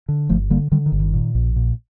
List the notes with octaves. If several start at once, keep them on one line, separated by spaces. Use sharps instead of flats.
D3
G1 F3 A3
D3 G3 A#3
D3 D#3 G3
D#3
G1
D#3
A#2
A#1
A#2